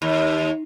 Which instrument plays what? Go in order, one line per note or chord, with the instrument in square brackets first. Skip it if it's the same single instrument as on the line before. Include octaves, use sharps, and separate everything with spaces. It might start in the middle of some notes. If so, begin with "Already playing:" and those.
[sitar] D#2